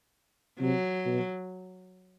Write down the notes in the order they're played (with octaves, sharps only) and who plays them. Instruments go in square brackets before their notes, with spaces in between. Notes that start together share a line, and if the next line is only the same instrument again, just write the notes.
[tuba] C3 [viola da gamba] F#3
[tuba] B2